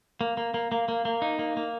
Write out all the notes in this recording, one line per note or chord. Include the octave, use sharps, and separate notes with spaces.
A#3
A#3
A#3
A#3
A#3
A#3
D#4
A#3
A#3